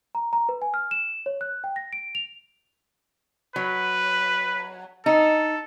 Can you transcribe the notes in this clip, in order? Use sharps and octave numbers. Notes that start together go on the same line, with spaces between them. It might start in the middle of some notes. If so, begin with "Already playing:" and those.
A#5
A#5
B4
G#5
F6
E7
C#5
F#6
G5
A#6
D7
F7
F#3 B4
D#4 A4